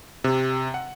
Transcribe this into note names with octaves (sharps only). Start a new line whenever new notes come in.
C3
F#5